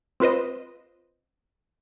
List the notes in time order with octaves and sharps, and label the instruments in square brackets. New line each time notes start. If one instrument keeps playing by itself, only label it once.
[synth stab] C4 F4 B4 C5 D#5